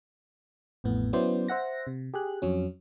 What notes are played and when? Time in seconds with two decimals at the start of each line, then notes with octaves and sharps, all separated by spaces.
0.84 A1 F2 A2 B3
1.13 F#3 B3 C#4 E4 C5 D5
1.48 C5 E5 F#5 A#6
1.87 C3
2.14 G4 G#4 F#6
2.42 F2 F#3 C#4